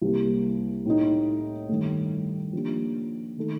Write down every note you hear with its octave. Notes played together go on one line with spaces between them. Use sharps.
C2 C3 G3 A#3
A2 A3 D#4
G2 D#3 A3
F3 A#3 D4 G4
D#3 A3 D#4 A4